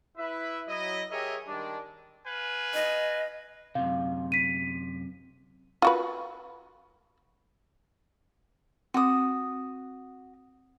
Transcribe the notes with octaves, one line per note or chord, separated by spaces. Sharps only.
E4 B4 E5
F#3 E4 D#5
G4 G#4 A#4 C#5 D#5 E5
D#3 G3 G#3 D4
B4 F5 G#5
D#5
F#2 C3 F5
B6 D#7
F4 F#4 B4
C4 F#4 D6 D#6